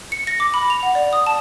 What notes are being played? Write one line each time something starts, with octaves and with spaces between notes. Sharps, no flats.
C#7
A#6
D6
B5
F7
F#5
D5
D#6
A5